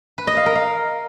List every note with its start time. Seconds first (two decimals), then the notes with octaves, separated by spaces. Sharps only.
0.18 B4
0.27 D#5
0.37 F5
0.46 A#4
0.55 F5